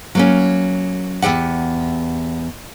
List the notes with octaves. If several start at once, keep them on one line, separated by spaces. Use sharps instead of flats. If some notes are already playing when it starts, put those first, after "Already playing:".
F#3 A#3 C#4
E2 G2 G4 F#5